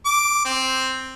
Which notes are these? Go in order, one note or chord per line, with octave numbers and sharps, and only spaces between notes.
D6
C4